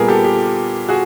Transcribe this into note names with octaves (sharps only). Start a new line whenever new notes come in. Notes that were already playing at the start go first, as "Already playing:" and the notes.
Already playing: A#2 G3 B3 G#4 A#4
G4 A4
G4
F#4 G#4